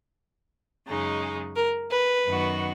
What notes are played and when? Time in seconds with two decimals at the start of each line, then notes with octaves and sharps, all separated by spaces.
0.87 F#2 C#3 G#3 D#4
1.56 A#4
1.91 B4
2.26 F#2 D#3 F#3 B3 F#4